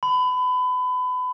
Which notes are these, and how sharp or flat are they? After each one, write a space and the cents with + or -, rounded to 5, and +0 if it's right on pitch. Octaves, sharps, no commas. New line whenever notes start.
B5 +30